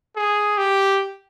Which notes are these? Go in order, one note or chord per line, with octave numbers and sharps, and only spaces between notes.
G#4
G4